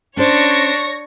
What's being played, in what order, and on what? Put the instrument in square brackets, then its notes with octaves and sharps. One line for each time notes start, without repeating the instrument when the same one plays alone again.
[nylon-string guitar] C#4 C5 [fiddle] D4 [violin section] C#5 C#6 A#6